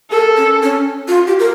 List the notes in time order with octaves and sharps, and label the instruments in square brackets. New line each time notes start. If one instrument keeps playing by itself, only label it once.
[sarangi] A4 [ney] A#4
[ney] C#4
C#4
F4
G4
A#4